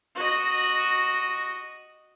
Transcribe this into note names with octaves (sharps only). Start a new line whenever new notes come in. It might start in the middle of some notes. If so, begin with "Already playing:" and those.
F#4 D#5